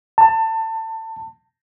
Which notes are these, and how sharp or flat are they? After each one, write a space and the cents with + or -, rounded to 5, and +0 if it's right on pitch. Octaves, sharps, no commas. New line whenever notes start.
A5 +25